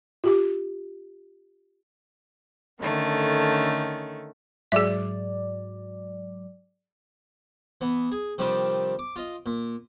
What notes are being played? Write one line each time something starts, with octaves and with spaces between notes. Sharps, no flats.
F4 G4 D6
D3 D#3 A3 C#4
G#2 F#3 G#4 D5 E5
E3 B3
G#4
C3 D#3 F3 G3 D4
D6
F4 D#5
A#2